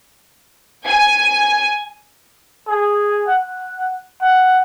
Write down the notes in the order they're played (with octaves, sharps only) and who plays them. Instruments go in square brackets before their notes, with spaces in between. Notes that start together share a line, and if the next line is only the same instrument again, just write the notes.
[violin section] G#5
[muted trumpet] G#4
F#5
F#5